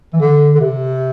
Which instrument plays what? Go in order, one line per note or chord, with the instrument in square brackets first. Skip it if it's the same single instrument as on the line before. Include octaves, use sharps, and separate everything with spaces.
[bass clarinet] E3
D3
D3
C3